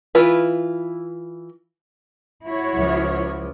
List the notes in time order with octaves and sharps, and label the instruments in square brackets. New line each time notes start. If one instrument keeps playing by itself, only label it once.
[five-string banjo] E3 E4 F4 B4
[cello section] E4 F#4 C#5
[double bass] C#2 F3